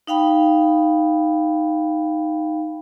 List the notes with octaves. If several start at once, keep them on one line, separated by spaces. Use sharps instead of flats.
D#4 F5 G5 B5